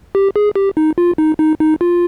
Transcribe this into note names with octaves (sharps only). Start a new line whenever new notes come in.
G4
G#4
G4
D#4
F4
D#4
D#4
D#4
F4